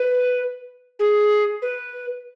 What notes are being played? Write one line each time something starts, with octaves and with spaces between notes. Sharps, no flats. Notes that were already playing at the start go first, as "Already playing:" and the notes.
Already playing: B4
G#4
B4